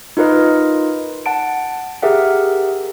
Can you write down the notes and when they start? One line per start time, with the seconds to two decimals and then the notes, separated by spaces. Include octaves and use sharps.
0.17 D#4 F4 A#4 B4 D#5
1.26 F#5 A5 D7
2.02 G4 G#4 A#4 E5 F#5